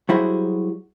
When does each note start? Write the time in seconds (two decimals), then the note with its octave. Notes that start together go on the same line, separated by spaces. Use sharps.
0.09 F#3 G3 E4 F#4 G#4 C5